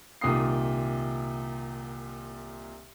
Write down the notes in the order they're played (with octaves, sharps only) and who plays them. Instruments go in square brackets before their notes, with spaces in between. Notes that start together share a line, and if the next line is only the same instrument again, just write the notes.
[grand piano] C2 A#2 D#3 D#6 C7